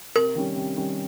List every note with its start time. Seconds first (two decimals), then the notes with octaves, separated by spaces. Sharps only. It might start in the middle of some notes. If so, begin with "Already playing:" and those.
0.16 C3 A#4
0.35 D#3 G3 C#4
0.55 C3
0.77 D#3 G3 C#4